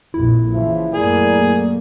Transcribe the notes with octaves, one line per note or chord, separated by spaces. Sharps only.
A#1 F2 E4
C#3 E3 F3 E5
F#2 A3 A#3 G#4 A#4 D5